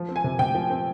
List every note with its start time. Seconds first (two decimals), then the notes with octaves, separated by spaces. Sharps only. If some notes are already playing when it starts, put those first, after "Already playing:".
Already playing: F3
0.09 C4
0.16 G#5
0.24 C3
0.39 C3 G5
0.55 F3
0.70 C4